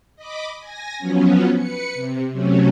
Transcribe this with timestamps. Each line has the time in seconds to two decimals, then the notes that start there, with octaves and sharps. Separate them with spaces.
0.16 D#5 B5 D6
0.60 G#5 A#6
0.99 F3 F#3 B3 C#4
1.55 B4 C#7
1.94 C3
2.33 C3 F#3 A3 C#4